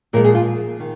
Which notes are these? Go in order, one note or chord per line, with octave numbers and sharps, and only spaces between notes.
A#2 F3 G#3 A#4
G#4
F4
D#3